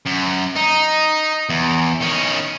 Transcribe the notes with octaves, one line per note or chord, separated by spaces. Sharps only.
F#2
D#4
E2
D#3 C#4